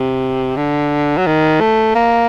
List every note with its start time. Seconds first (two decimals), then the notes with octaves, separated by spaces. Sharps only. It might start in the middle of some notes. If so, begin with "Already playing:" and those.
Already playing: C3
0.57 D3
1.18 F#3
1.26 D#3
1.61 A3
1.95 A#3